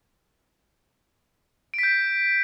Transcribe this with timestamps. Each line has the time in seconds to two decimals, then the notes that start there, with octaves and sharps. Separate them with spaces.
1.74 D7
1.78 B6
1.83 G6